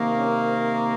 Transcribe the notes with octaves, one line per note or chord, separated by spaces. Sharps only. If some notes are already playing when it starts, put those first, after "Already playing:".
Already playing: C3 D#3 A#3
C#4
C4